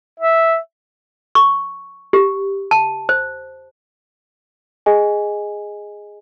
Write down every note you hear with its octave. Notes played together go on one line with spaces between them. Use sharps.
E5
C#6
G4
A5
C5
G#4 D#5 G#5